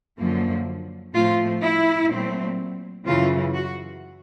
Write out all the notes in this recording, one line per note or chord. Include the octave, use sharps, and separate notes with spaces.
F#2 D3 F3 A#3
A2 F3 A3 C4 F4
E4
A#2 F#3 A3 C4
F#2 C#3 E3 F4
F#4